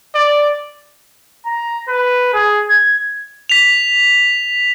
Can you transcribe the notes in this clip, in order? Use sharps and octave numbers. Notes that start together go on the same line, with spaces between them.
D5
A#5
B4
G#4
G#6
B6 F7